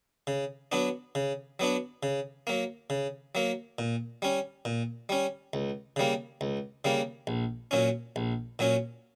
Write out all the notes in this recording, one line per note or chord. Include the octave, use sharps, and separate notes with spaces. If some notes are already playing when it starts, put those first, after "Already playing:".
C#3
F#3 B3 D4
C#3
F#3 B3 D4
C#3
F#3 A#3
C#3
F#3 A#3
A#2
G3 C#4
A#2
G3 C#4
C#2
C#3 G3 A#3
C#2
C#3 G3 A#3
A#1
A#2 F#3 C#4
A#1
A#2 F#3 C#4